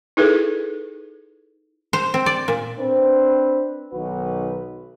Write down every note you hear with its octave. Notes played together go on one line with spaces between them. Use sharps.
D#4 E4 G#4 A4 B4
C5
C4
D5
A#2
C4 D4 B4 C5
B1 D#3 D#4 F#4 B4